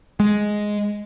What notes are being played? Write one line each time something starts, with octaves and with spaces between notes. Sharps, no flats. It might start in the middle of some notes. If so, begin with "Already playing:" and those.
G#3